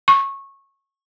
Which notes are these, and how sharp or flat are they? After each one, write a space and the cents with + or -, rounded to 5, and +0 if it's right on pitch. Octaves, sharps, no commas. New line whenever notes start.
C#6 -15